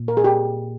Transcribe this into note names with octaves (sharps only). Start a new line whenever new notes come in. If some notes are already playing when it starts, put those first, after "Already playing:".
Already playing: A#2
A#4
G#4
G4